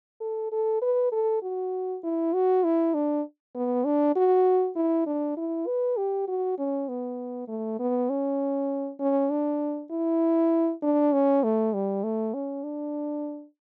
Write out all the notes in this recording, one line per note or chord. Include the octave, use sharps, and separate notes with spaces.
A4
A4
B4
A4
F#4
E4
F#4
E4
D4
B3
D4
F#4
E4
D4
E4
B4
G4
F#4
C#4
B3
A3
B3
C#4
C#4
D4
E4
D4
C#4
A3
G3
A3
C#4
D4